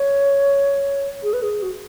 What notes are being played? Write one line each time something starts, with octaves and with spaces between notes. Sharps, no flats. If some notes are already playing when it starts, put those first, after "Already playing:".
Already playing: C#5
G#4
B4
G#4
F#4